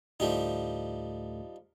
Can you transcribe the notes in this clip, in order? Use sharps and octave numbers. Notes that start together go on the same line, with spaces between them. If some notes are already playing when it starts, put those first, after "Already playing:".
D2 A2 F3 G3 A3 D#4